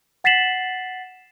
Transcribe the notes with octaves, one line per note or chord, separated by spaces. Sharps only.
F#5 A6 B6 C7 E7 F#7